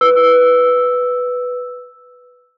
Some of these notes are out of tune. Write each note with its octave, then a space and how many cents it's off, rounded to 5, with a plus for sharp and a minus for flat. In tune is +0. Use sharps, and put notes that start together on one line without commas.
B4 +0 E6 +0